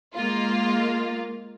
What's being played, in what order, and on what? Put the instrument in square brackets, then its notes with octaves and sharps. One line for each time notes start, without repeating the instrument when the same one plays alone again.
[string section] G#3 A#3 F4